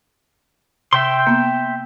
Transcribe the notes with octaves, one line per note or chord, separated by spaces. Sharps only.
C3 E5 G5 C6
A#3 B3